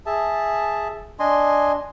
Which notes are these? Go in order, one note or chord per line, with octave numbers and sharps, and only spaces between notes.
G#4 E5 A5
D4 D#5 G#5 C6